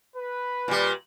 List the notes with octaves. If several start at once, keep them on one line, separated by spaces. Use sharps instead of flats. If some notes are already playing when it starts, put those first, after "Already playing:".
B4
A#2 G3